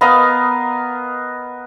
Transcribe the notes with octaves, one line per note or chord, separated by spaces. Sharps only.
B3 A#4 D#5 F5